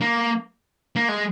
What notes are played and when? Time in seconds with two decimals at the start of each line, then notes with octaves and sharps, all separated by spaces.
0.01 A#3
0.96 A#3
1.09 G#3